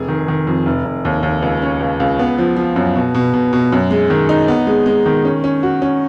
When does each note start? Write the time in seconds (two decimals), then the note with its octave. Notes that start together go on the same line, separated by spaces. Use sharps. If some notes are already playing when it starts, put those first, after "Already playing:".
Already playing: F1 G#4
0.08 D#3
0.28 D#3
0.47 F2
0.66 F1
0.85 F1
1.05 D#2
1.23 D#2
1.42 C#2
1.62 C#4
1.81 C#2
2.00 C#2
2.19 B3
2.38 F3
2.57 F3
2.76 F#2
2.96 B2
3.14 B2
3.34 B2
3.53 B2
3.72 F#2
3.91 G#3
4.10 D#3
4.29 D#4
4.48 B3
4.67 G#3
4.86 G#3
5.06 D#3
5.25 C#4
5.44 C#4
5.63 F#4
5.82 C#4